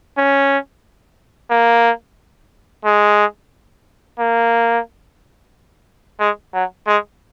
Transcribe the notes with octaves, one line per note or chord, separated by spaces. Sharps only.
C#4
A#3
G#3
A#3
G#3
F#3
G#3